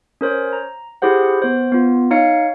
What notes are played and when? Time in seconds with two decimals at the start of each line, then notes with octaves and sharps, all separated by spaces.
0.21 C#4 A#4 C5 C#5
0.53 A#5
1.02 E4 G4 G#4 C5 F#5
1.42 B3 C5
1.72 B3 F4
2.11 D#4 C#5 F5 C#7